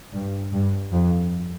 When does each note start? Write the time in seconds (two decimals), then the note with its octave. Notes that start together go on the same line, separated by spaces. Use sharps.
0.13 G2
0.53 G2
0.93 F2